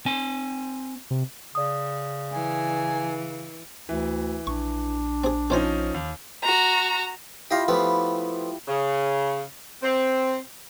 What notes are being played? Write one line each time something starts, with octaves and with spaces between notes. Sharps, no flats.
C4 G#5
C3
C#3 D5 D#6
E3 G#5
D2 E3
A#1 D4 C#6
C4 G#4
F3 C4 C#4 D#4 C5 G#5
D#2
F#4 A#5
E4 F4 G4 D#5 F5
F3 A3 B3 G4 B5
C#3
C4